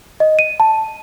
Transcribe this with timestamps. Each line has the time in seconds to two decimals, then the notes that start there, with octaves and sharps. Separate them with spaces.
0.20 D#5
0.39 D#7
0.60 A5